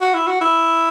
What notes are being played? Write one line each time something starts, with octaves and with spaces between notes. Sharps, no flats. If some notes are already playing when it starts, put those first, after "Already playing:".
F#4
E4
F#4
E4